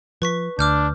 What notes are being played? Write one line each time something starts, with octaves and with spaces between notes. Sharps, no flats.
F3 B4 C#6 B6
D2 D4 D6 F6 G6